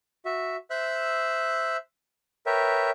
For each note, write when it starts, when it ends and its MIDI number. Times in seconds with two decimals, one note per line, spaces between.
0.25 0.56 66
0.25 0.56 76
0.70 1.77 72
0.70 1.77 76
0.70 1.77 88
0.70 1.77 90
2.46 2.90 70
2.46 2.90 71
2.46 2.90 73
2.46 2.90 76
2.46 2.90 79